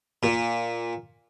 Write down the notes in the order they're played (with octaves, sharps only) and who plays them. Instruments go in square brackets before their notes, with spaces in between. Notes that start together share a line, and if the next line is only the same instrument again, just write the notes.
[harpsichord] A#2